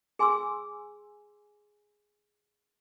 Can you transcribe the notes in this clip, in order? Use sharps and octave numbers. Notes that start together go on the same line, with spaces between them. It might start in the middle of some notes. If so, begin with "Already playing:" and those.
G#4 G#5 C6 D6 E6